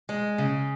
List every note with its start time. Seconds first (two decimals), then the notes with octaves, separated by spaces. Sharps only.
0.09 G#3
0.38 C#3